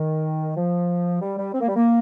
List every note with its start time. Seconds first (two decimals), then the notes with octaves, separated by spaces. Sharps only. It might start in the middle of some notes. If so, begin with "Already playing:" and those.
Already playing: D#3
0.57 F3
1.22 G3
1.38 G3
1.54 C4
1.61 A#3
1.69 G3
1.76 A#3